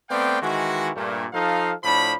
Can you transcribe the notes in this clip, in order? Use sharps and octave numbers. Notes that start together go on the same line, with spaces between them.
A3 B3 C4 D5 F5 G5
D#3 E3 G#3 F#4
G2 A#2 A3
F3 D#4 A4 F5
A2 F3 D4 B5